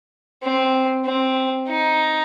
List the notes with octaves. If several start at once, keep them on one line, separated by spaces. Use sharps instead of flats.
C4
C4
D#4